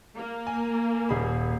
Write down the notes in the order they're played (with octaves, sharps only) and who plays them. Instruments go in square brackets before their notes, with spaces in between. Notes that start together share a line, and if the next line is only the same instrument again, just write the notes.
[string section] A#3
[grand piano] G#5
D#1 G#4 B5